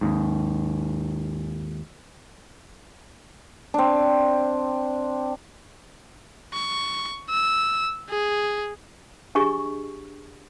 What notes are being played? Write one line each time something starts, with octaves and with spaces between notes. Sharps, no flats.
D#2 G#2
C4 D4
C#6
E6
G#4
D4 G4 G#4 D#5 C#6